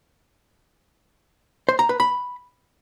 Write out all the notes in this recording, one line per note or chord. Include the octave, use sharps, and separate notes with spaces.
C5
A#5
B4
B5